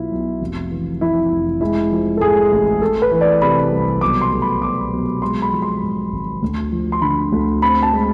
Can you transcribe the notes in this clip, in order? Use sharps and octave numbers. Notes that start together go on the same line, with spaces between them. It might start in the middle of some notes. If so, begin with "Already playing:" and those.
Already playing: B1 B2 B3 E4 F4
B1
F1
E3
F2 E4
F1
G#3 E4
F3
A4
G#2 G#4
A1
A3 A4
B4
E3
D5
C3 B5
C2
B1 D6
C6
A3
B5
B2 D6
B1
G#3 C6
B5
F3
C6
G#2
G#1
D2
F3
C6
D3 B5
D2
C4 B5
A5
G#3